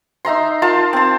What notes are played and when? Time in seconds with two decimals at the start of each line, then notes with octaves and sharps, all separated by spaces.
0.25 D#4 E5 A#5 C6
0.62 F4 A#4 A5 C6
0.93 C4 A5